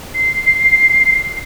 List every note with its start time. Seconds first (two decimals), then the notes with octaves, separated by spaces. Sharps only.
0.14 C7